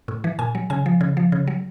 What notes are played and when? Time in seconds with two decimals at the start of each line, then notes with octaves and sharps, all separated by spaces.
0.08 A2
0.24 E3
0.39 A#2 G#5
0.55 F#3
0.70 C#3 G#5
0.86 F3
1.01 C#3
1.17 F3
1.32 C#3
1.47 F#3